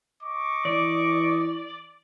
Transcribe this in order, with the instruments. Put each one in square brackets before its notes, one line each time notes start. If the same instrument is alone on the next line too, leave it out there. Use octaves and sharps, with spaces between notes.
[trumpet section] D#5 C#6 D6
[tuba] E3 [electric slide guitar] D5